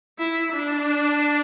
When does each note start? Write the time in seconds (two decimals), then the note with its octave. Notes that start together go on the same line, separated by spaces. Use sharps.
0.19 E4
0.53 D4